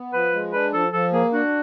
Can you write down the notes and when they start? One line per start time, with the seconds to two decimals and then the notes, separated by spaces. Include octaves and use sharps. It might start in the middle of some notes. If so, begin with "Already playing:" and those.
Already playing: B3
0.13 F3 B4
0.34 G#3
0.53 D4 B4
0.73 F3 A4
0.93 F3 A4
1.13 A#3 G#4
1.33 D4 F#4